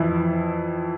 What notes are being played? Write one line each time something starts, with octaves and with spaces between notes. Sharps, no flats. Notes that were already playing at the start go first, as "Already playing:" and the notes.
Already playing: F2 E3 E4